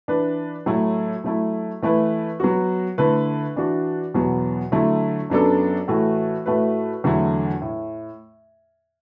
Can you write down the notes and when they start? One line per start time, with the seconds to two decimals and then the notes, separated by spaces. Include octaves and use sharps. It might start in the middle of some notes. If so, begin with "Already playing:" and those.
0.08 E3 D4 B4
0.66 A2 F#3 A3 E4
1.24 F#3 A3 E4
1.82 E3 A3 E4 B4
2.40 F#3 B3 F#4
2.98 D3 A3 E4 B4
3.56 E3 D4 F#4
4.14 E2 B2 F#3 B3
4.72 D3 F#3 A3 E4
5.30 F#2 F#3 B3 D4 A4
5.88 A2 E3 A3 F#4 A4
6.46 A2 A3 F#4 B4
7.04 E2 D3 F#3 A3 E4
7.61 A2